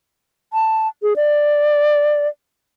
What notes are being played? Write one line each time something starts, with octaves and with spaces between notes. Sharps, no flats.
A5
G#4
D5